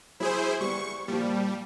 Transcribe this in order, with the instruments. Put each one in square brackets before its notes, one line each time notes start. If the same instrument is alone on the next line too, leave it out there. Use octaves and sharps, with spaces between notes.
[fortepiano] F#3 [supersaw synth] E4 G#4 C5
[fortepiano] G3 B3 [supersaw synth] C#6
[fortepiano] A#2 F3 [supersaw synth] G3